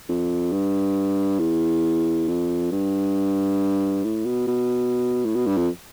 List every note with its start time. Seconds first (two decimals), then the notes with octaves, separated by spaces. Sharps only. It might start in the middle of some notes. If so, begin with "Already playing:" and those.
0.09 F2
0.52 G2
1.39 E2
2.28 F2
2.72 G2
4.04 A2
4.25 B2
4.47 B2
5.25 A2
5.35 B2
5.46 G2
5.57 F2